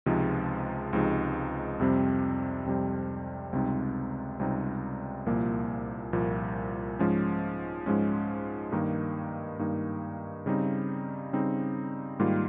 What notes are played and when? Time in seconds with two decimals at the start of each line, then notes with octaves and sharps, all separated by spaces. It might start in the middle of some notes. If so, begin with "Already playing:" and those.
0.06 C#2 C3 F3 G#3 D#4
0.93 C#2 C3 F3 G#3 D#4
1.80 F2 C3 G3 C4
2.66 F2 C3 G3 C4
3.53 C#2 C3 G3 C4 D#4
4.39 C#2 C3 G3 C4 D#4
5.26 C2 A#2 F3 A#3
6.13 C2 A#2 F3 A#3
6.99 G#2 F3 G#3 C#4
7.86 G#2 F3 G#3 C#4
8.72 G2 D#3 A#3 D#4
9.59 G2 D#3 A#3 D#4
10.46 C#3 G3 C4 D#4
11.33 C#3 G3 C4 D#4
12.19 G#2 D#3 G3 A#3 F4